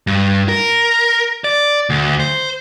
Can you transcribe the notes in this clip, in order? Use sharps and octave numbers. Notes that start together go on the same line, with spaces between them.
G2
A#4
D5
D2
C5